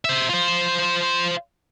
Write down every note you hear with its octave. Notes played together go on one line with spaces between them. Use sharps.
C5 E5
F4 C5